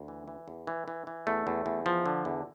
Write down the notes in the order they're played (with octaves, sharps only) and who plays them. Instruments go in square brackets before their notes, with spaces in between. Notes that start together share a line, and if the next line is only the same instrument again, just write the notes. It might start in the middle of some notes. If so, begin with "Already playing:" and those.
Already playing: [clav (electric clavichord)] D2
E3
E3
E2
E3
E3
E3
E2 A3
E2
E2
F3
D3
E2